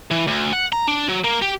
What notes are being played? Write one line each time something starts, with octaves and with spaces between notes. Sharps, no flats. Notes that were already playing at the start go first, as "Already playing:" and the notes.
E3
D2
F#5
A#5
D4
F#3
A#3
G4